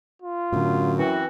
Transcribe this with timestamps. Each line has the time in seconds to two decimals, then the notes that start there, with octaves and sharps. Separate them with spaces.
0.22 F4
0.52 F#2 A2 D3
0.98 E3 C4 F#4